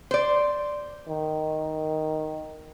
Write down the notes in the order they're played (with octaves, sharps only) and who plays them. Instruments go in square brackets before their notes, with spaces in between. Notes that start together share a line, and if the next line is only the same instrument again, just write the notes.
[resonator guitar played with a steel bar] C5 D5
[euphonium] D#3